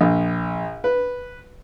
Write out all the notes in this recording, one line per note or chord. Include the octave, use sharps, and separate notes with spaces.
A#1
B4